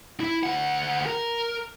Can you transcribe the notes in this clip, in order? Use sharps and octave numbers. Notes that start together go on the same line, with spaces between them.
E4
D2 F#5
A#4